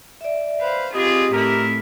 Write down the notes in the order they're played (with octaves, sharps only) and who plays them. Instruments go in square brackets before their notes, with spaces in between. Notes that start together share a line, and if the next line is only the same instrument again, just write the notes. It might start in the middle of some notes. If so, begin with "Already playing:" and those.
[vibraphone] D5 E5
[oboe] B4 [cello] C5 F5
[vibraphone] C4 [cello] F4 G#4 [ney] G4 [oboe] D#5
[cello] A2 E4 [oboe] A#4